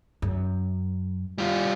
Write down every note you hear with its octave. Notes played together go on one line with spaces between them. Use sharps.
F#2
G3 F4